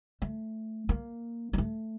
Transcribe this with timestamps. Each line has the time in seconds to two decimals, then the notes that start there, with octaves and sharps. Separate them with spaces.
0.22 A3
0.89 A#3
1.53 G#3
1.58 A3